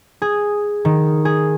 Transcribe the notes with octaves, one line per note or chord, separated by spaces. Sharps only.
G#4
D#3
G#4